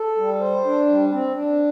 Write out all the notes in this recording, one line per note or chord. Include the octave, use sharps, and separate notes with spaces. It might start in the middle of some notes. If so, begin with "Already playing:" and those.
Already playing: A4
G3
C5
D4
G3
C4
D4